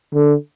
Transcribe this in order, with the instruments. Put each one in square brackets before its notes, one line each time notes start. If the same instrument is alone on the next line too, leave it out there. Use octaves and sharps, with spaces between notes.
[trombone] D3